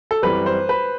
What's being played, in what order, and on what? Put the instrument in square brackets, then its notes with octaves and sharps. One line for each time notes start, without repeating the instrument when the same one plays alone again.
[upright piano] A4
[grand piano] F#2 E3 G3 C4 G4 [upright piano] B4
[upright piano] C5
B4